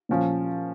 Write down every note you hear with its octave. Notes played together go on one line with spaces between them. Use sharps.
A#2 F3 C#4